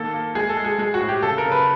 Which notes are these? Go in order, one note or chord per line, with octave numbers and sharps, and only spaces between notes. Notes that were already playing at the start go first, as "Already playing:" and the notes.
Already playing: D#3 A#3 A4
A#3
G#3 G#4
A4
G#3
G#4
G#3 G#4
F#4
A2
G4
C#3 A4
A#4
C#3
B4